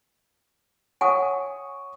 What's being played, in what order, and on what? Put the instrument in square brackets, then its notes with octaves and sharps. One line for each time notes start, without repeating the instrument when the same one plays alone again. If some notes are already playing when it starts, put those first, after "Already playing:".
[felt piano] C#5 C#6 D#6 [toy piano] F#5 G#5